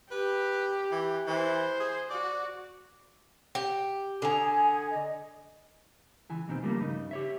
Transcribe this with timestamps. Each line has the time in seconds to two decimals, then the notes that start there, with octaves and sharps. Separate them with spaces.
0.11 G4 B4
0.92 E3
1.27 E3 C5
1.80 G#4
2.10 F#4 D5
3.55 G4
4.22 D3 G#5 A#5 D#6
4.90 D#5
6.29 C#2 E3 G#5
6.48 D#2 B2 D#3 C4
6.63 C#3 F3 G3 A3 A#3
6.79 G2 C#3 D#4
7.11 G4 C#5 E5